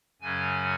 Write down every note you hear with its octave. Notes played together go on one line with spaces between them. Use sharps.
F#2 C#3 F#3 C#4 G#5